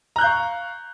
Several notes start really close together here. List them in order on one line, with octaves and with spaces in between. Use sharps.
A#5 F#6 G6 F5 C#6